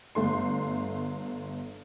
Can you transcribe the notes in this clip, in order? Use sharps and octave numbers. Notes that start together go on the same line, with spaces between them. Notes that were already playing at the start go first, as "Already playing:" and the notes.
G1 A3 C6